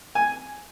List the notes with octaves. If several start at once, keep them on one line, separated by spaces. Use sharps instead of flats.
G#5